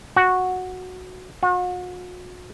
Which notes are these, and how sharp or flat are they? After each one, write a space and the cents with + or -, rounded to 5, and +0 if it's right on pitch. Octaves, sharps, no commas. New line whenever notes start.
F#4 -5
F#4 -40